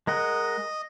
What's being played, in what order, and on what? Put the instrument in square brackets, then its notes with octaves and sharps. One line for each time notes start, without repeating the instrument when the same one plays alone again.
[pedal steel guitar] G#3 A#4 F#5 [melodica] D#5